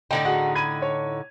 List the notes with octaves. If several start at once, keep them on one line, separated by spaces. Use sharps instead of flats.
A2 D3 D#4 G5
F#4 G#4 F#5
B5 G#6 D#7
C#5